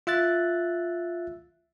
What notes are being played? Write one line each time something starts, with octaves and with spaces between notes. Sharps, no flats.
F4 E5 F#6 A6